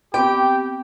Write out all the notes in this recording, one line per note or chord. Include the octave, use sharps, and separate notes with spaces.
B3 C4 G4 G5